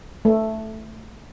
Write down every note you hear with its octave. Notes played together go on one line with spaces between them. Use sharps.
A3